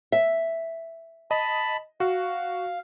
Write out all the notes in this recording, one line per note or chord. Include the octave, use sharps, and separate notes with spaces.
E5
D#5 A5 B5
F#4 F5